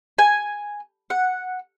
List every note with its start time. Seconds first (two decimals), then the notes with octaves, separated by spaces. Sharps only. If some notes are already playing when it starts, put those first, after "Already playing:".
0.18 G#5
1.10 F#5